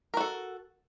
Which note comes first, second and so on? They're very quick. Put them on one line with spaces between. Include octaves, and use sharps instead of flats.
A#4 F#4 A4